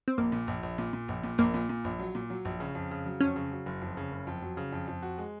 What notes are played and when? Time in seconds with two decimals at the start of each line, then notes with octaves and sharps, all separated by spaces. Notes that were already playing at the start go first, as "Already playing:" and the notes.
0.08 C4
0.18 A#1 A#3
0.32 A#2
0.48 A#1
0.63 A#1
0.78 A#2
0.93 A#2
1.08 A#1
1.23 A#2
1.38 A#1 A#3
1.54 A#2
1.69 A#2
1.84 A#1
1.99 F#3
2.15 A#2
2.30 F#3
2.45 A#1
2.60 C#3
2.75 F2
2.91 C#3
3.06 F#3
3.21 F2 C#4
3.36 C#3
3.51 F#3
3.66 F#1
3.82 F2
3.97 C#3
4.11 F#1
4.27 F2
4.42 F#3
4.57 C#3
4.73 F2
4.88 F2
5.02 F#4
5.18 G#3